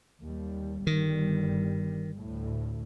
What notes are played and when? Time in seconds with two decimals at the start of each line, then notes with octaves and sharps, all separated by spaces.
0.23 D#2 G3
0.87 G1 D#3 G3
2.18 D2 A2